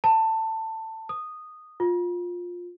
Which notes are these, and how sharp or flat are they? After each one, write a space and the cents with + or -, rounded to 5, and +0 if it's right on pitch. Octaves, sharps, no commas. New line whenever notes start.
A5 +20
D#6 -10
F4 +15